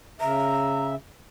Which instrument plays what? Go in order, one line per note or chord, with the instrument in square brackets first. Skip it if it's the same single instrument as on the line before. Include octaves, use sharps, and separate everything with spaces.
[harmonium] C#3 E5 [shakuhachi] A#5